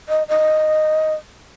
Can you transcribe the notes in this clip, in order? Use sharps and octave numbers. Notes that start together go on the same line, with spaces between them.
D#5
D#5